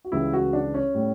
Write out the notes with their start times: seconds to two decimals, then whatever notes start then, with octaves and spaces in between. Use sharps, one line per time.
0.05 F#4
0.12 C#2 C#3 E3 G3 E4
0.33 F#4
0.53 D4
0.74 C#4
0.95 A2 G3